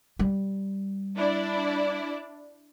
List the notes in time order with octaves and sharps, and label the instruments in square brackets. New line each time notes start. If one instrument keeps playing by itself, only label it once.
[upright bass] G3
[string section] D4 E4 D5